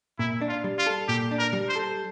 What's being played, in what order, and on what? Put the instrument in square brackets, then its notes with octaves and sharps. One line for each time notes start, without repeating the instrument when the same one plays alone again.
[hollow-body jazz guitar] A#2 [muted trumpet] E4
[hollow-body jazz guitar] D4
[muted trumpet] F4
[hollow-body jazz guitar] G3
[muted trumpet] F4
[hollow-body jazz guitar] A4
[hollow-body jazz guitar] A#2 [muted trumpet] G4
[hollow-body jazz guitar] D4
[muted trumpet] A#4
[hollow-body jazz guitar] G3
[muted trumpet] C5
[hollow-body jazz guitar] A4